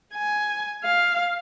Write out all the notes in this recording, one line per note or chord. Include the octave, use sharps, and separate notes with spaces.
G#5
F5